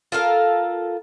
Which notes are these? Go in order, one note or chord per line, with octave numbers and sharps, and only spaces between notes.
F4 A4 A#4 F5